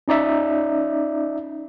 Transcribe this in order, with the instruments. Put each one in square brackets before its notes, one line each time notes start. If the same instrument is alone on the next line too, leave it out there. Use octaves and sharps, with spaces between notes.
[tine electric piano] C#4 D#4 D5 E5